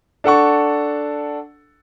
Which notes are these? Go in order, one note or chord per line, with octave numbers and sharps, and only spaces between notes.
D4 A4 F#5 C#6